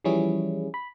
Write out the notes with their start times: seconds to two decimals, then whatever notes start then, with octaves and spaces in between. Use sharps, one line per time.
0.04 E3 F3 G3 C#4 E4 G#4
0.74 B5